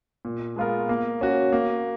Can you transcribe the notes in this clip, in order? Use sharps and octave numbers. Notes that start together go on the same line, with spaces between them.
A#2
G#3 B3 F4 A#4
A#3
C#4 F#4
A#3